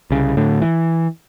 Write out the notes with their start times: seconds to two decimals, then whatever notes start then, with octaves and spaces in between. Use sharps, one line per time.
0.10 C2 C#3
0.37 D2 A2 D3
0.62 E3